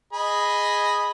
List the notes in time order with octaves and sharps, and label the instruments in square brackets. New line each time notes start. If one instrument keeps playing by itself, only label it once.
[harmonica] G#4 D#5 B5